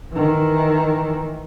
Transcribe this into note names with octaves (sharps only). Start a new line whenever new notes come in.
D#3 E3